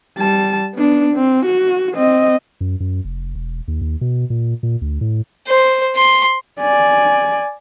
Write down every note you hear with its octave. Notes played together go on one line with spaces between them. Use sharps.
G3 A5
B3 D4
C4
F#4
C4 D#5
F#2
F#2
F1
E1
D#2
D#2
B2
A#2
A#2
D2
A2
C5
C6
D5 G#5